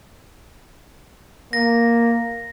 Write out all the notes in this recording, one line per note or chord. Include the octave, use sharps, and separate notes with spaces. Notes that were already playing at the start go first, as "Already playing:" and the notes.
A#3 A#6